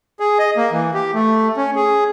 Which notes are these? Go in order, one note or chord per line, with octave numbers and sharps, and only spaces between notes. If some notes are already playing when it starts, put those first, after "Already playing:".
G#4
D#5
A#3
E3
G4
A3
C#4
G#4